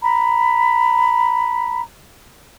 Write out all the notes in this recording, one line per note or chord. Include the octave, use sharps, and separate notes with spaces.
A#5 B5